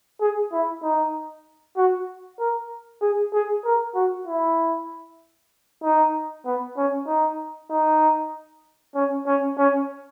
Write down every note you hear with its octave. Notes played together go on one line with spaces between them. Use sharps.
G#4
E4
D#4
F#4
A#4
G#4
G#4
A#4
F#4
E4
D#4
B3
C#4
D#4
D#4
C#4
C#4
C#4